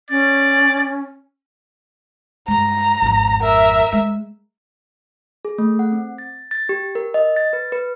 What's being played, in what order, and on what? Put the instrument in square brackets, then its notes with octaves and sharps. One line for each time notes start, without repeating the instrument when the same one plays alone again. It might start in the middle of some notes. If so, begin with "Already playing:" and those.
[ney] C#4 [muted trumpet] D5
[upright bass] G2 G#3 [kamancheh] A#5
[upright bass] G#1 F2
[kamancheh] A#4 E5
[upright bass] G#3
[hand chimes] G#4
A3
F#5
C4
A6
A6
G4
A#4
D#5
A6
B4
B4